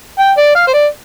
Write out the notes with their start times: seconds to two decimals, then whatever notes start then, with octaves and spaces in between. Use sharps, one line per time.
0.19 G5
0.37 D5
0.55 F5
0.67 C5
0.74 D5